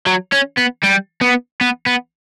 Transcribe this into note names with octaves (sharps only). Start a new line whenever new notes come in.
F#3
C#4
B3
G3
B3
B3
B3